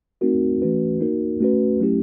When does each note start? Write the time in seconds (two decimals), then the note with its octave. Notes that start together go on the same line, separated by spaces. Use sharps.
0.21 A3 C4 D#4 F#4 A#4
0.62 E3 A3 C#4 F#4 B4
1.00 A#3 D#4 F#4 A#4
1.40 A3 C#4 F#4 B4
1.80 F#3 A3 C#4 E4 G4